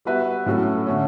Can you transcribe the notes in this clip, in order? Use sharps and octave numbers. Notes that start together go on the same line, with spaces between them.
G3 B3 F#4 B4 E5
A2 F#3 C#4 F#4 A4
D3 A3 C#4